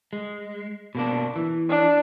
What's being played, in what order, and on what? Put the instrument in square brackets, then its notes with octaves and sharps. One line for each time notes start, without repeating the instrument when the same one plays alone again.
[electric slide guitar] G#3
B2 A#3 D4
E3
[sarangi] D4